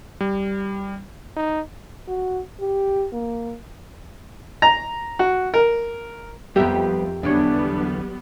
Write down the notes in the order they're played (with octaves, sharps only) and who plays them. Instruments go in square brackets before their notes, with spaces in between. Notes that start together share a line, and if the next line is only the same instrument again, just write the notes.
[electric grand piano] G3
[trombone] D#4
[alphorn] F#4
G4
A#3
[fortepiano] A#5
F#4
A#4
[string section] F2 [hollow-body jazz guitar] G3 B3 [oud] G4 A#4 E5
[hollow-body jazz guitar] E2 D3 C#5 [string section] F#3 G3 B3 [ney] D4